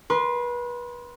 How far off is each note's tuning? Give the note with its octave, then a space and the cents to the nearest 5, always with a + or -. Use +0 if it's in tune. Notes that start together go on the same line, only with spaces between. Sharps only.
B4 -30 C6 +0